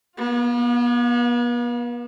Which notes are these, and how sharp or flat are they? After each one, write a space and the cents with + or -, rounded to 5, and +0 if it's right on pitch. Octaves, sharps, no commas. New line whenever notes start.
B3 -40 F4 +30